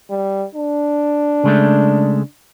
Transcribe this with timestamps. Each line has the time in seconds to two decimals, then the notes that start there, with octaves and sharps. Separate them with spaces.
0.10 G3
0.55 D4
1.44 C#3 G#3 A3